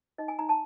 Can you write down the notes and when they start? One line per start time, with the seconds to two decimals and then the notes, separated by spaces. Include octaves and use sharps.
0.18 D#4 D#5
0.28 G#5
0.39 D#4 A#5
0.49 A5